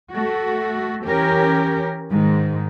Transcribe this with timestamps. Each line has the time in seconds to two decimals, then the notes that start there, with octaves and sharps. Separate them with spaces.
0.10 A3 F#4
1.03 E3 C#4 G4 A#4
2.10 G#2 D#3